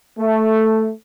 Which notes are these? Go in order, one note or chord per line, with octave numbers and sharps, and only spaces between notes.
A3